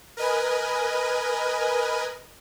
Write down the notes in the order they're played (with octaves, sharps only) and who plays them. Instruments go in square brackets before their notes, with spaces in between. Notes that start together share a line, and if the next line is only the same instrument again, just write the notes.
[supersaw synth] A#4 B4 D#5 G#5